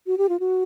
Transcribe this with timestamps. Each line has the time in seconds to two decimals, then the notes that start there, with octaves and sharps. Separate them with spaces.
0.07 F#4
0.18 G4
0.29 F4
0.40 F#4